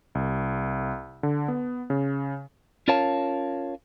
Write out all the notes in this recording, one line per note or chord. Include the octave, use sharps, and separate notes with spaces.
C2
D3
B3
C#3
C#4 F4 A#4 C#5 F5 A5